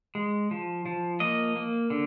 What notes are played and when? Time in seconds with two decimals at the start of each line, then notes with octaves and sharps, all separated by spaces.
0.15 G#3
0.51 F3
0.86 F3
1.20 A#3 D#5
1.56 A#3
1.90 D3